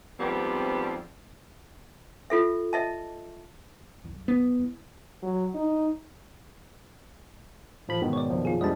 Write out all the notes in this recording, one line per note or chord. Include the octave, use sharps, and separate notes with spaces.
F2 G#2 G3 B3 C4
F4 A4 E5
D#5 E5 A5
C2 F#2
B3
G#3 E4
F#3
D#4
A1 F3 B5
G#2 B2 D#3
C#5 D5
A#1 F#2 F3
F4 G#4
E2 G#2 D3 G3 D#5 A5